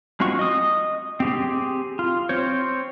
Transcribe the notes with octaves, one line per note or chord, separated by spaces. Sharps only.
G#3 C4 F4 F#4 C#6
D#5 D#6
C4 G4 G#4
F4
C4 C5 C#5